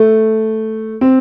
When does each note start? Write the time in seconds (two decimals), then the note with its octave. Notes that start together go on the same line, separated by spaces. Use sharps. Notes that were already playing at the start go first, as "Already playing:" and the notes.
Already playing: A3
1.01 C4